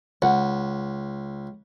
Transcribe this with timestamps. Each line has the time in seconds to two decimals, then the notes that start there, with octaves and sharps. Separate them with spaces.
0.22 C#2 F#5